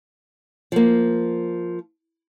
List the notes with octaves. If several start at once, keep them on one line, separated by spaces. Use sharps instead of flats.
F3 A#3